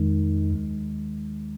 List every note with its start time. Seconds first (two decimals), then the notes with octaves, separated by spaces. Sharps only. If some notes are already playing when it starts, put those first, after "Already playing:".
Already playing: F2 D#3 G#3 D#4
0.51 D#2 D#3 G#3